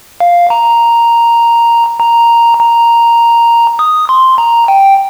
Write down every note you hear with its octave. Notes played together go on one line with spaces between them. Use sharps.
F5
A#5
A#5
A#5
D#6
C6
A#5
G5